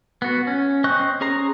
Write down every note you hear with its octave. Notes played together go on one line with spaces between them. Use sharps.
B3 F#4
C#4
C4 C5 D#5 C#6 F#6
C#4 G#4 C5 A#5